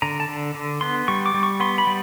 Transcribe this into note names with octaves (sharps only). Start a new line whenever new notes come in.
D3 A#5
A5
D3
D3
B3 C6
G3 C#6
D6
G3
C#6
B3 C6
B5
G3